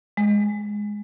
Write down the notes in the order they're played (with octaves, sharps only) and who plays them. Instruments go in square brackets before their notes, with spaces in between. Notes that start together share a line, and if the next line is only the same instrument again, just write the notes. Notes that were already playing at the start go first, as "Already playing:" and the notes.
[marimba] G#3